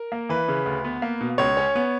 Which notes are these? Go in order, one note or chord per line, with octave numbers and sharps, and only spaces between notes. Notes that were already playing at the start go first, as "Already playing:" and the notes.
Already playing: A#4
A#3
E3 B4
C#3
D2
B3
A#3
B2
C#2 C#5
C#4
B3